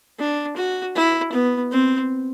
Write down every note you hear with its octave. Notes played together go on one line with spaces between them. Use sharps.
D4
F#4
E4
B3
C4